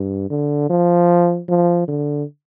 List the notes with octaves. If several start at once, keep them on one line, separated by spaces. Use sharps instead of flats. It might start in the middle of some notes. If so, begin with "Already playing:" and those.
Already playing: G2
D3
F3
F3
D3